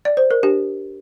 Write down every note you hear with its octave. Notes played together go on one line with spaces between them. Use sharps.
D5
C5
A#4
D4 G4